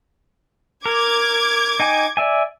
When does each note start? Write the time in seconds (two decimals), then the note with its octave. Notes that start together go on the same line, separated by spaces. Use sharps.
0.86 A#4 D6 G#6
1.80 D#4 G5 G#5
2.17 D5 E5 G#5